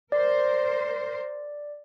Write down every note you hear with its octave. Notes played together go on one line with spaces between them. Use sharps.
A#4 C5 D5